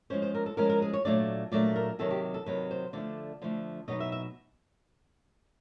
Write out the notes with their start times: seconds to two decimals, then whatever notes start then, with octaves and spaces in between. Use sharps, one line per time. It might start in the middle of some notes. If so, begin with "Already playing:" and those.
0.10 F3 G#3 C#4 C5
0.22 C5
0.35 A#4
0.46 A4
0.57 F3 G#3 C#4 A#4
0.69 A#4
0.82 G#4
0.93 C#5
1.05 A#2 F#3 A3 D4 D5
1.52 A#2 F#3 A3 D4 D5
1.76 A#4
1.99 C3 D#3 F#3 A4
2.11 G4
2.34 A4
2.46 C3 D#3 F#3 B4
2.71 C5
2.93 D3 F3 A3 D4 D5
3.42 D3 F3 A3 D4
3.88 B2 F#3 B3 D#4 D#5
4.00 E5
4.12 E5